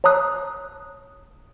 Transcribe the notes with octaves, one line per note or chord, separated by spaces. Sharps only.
C#5 A5 A#5 D#6 F#6